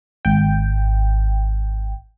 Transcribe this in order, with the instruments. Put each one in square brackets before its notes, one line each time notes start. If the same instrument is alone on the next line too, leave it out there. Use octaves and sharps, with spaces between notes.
[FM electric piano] G#1 G5